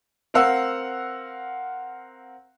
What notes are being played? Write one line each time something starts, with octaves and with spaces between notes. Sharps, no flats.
C4 A#4 F5 F#5 E6